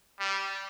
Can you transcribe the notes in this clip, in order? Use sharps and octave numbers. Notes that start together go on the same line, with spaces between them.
G3